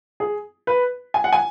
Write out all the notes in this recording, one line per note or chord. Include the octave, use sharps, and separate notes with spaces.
G#4
B4
G#5
F#5
G#5